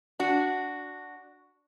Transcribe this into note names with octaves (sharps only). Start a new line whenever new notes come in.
D4 F#4